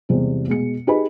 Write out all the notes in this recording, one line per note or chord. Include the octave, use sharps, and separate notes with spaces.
E2 C3 G3 G#3
B2 G#3 C#7
D#4 G4 G#4 B4 D#5 B5